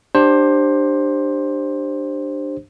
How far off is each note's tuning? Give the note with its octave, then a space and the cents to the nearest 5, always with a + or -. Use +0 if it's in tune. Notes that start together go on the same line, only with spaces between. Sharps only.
D4 +15 G4 +0 C5 +15